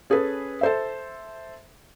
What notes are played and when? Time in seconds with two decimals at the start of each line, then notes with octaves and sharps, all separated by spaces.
0.10 C#4 G#4 A4 B4
0.61 A4 C5 E5